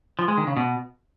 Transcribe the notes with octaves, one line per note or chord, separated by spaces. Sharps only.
F3
G#3
D#3
C#3
B2